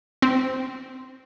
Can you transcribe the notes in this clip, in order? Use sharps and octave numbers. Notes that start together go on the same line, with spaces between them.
C4